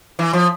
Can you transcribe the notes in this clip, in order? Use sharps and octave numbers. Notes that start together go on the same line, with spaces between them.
E3
F3